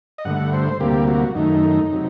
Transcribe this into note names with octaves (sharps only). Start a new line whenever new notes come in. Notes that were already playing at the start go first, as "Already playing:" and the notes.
D#5
G2 D3 A3 F#5
C5
D2 C3 G3 A#3 G4
F#4
F#2 D#3 A3 D#4
C3 F#3